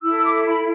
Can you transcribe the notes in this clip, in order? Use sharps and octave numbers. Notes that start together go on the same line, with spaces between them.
E4 A4 E6
E6
D6
B5